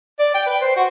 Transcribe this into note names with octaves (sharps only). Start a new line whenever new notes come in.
D5
G5
B4
C5
F#4